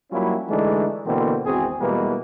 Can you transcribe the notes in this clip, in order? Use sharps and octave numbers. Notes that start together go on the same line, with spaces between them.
F#3 G3 A#3 C#4 E4 F4
D3 E3 G#3 A3 D4 D#4
B2 D3 E3 A#3 C4
G#1 E2 C4 F#4 G#4
B2 E3 G3 G#3 A#3 B4